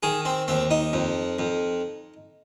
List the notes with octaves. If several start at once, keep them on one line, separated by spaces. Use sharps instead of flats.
D#3 G#4
C4
D#2 C4
D#4
F2
F2